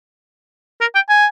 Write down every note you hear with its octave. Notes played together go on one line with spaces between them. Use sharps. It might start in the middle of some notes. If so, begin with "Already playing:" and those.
A#4
G5
G#5